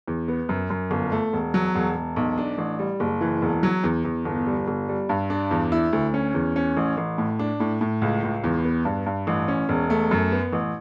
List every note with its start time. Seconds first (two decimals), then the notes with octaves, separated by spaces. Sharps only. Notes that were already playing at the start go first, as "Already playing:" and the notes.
0.08 E2
0.28 B3
0.49 F#2
0.70 F#2
0.91 G1
1.12 A3
1.33 E1
1.54 F#3
1.75 E1
1.95 E1
2.16 B1
2.38 D4
2.58 A1
2.79 G3
3.00 F#1
3.21 E3
3.42 E1
3.63 F#3
3.84 E2
4.05 E2
4.25 G1
4.46 G3
4.68 G1
4.89 G3
5.09 G2
5.30 D4
5.51 E2
5.72 E4
5.93 D2
6.14 C#4
6.34 E2
6.56 C#4
6.77 A1
6.97 A1
7.18 A2
7.39 D4
7.60 A2
7.81 A2
8.02 C#2
8.23 C#2
8.44 E2
8.64 B3
8.85 G2
9.06 G2
9.27 A1
9.48 C#4
9.69 E1
9.90 A3
10.11 F#2
10.32 B3
10.53 A1